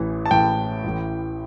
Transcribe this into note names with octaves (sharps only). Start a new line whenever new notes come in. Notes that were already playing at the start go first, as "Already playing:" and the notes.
Already playing: A1 A2 E3
A5
A1 A2 E3 G5
A1 A2 E3